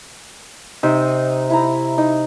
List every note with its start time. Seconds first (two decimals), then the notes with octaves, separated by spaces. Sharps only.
0.83 C3 D#4
1.50 E4 A#5
1.98 D#4